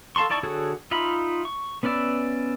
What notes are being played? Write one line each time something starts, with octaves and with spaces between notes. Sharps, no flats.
A4 F5 A5 C6 C#6
D#4 E4 D5 A5 C#6
D3 F#4 G#4 A4 C#5
D#4 F4 E5 B5
C#6
B3 C#4 B4 D5 E5